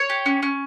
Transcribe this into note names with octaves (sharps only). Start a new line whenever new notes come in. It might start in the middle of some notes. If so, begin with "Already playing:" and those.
Already playing: C#5
G4
C#4
C#4